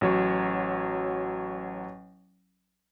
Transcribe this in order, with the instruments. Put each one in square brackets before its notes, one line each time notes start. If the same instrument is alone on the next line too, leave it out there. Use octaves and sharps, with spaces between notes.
[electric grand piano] A1 F#3 C#5